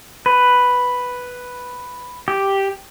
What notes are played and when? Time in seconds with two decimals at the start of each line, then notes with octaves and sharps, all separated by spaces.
0.26 B4
2.28 G4